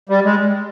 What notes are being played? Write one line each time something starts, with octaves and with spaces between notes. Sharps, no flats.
G3
G#3